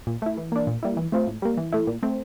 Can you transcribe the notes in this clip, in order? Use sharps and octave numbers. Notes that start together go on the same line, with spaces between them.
A#2
A3 E4
E3
A#3 D4
A#2
G3 A#3 E4
E3
A3 C4 F4
A2
G3 A#3
E3
A3 E4
A#2
A3 C4